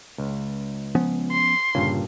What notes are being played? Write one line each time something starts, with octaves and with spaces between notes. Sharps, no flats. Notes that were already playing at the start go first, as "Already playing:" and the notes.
C#2
F3 B3 C#4
C6
G1 G2 A#2 C#3